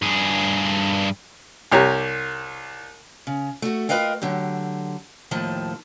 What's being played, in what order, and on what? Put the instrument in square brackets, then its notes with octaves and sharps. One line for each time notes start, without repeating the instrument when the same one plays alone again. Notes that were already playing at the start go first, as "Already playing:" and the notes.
[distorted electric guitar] G2 G#4
[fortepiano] C2 G4 C#5 A#5
[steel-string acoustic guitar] C#3
A3 F#4
F4 A#4 B4 D#5 F5 G5
D3 F#3 G4
D#2 A2 D#3 F3 A5